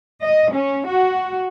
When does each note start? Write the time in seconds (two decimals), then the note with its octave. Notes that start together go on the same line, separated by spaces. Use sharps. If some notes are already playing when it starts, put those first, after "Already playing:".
0.22 D#5
0.52 C#4
0.87 F#4